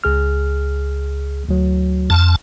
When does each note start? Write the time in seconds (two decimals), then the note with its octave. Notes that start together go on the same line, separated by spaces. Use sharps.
0.04 C#2 G#4 F6
1.49 D2 F#3
2.10 F2 A5